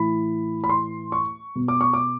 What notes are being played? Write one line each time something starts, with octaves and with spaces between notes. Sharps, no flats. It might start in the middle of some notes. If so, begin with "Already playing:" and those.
Already playing: A2 E3 B5
B5
C6
C#6
B2
D6
C#6
D6